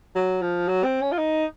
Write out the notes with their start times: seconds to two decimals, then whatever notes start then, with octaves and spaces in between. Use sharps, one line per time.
0.15 F#3
0.42 F3
0.68 F#3
0.84 C4
1.01 C#4
1.12 F4
1.18 D#4